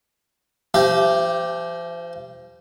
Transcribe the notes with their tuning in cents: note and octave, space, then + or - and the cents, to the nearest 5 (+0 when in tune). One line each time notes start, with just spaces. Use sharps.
F3 -30 G4 +0 E5 +30